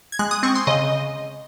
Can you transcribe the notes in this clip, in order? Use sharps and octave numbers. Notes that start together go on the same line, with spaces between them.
G#6
G#3 F#6
D#6
C4 C#6
C6
C#3 D#5